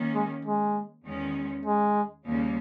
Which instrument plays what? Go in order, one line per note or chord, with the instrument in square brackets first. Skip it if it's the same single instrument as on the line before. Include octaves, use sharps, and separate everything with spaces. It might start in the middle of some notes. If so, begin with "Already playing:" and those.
Already playing: [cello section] D#3 A#3 C#4
[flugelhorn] G#3
G#3
[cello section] E2 D#3 G#3 C#4
[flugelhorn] G#3
[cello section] D#2 C#3 G3 A#3